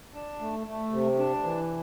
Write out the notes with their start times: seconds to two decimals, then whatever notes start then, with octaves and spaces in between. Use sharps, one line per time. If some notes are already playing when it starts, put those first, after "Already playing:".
0.14 D4
0.40 A3
0.67 A3
0.92 C3
1.18 D4
1.44 E3